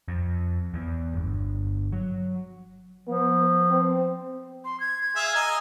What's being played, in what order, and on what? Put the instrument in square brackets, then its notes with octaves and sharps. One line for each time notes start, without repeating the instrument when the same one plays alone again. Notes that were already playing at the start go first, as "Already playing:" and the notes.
[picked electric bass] F2
E2
G1
F#3
[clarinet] F3 [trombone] B3
[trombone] C4
[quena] C6
G#6
[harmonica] G#4 E5 F5
D#5 G#5 A#5